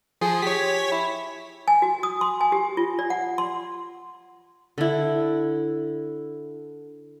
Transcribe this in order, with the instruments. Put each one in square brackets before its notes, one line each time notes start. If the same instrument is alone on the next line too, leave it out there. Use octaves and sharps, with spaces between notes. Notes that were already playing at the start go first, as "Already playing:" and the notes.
[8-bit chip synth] F3 [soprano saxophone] G#4
[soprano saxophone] G4 [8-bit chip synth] C#5 B6
[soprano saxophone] E4
[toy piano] G#5
F#4
D#6
C6
G#5
G4
F4
D5
F#5
C6
[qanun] D3 E4